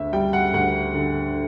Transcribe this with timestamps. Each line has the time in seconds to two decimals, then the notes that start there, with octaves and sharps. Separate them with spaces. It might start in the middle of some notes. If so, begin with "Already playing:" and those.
Already playing: D2 E5
0.13 G3 G5
0.33 F#5
0.54 D2 F#5
0.94 D3